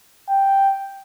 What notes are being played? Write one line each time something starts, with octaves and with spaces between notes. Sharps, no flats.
G5